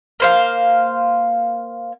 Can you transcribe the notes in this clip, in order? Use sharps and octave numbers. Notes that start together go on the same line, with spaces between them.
A#3 C5 F5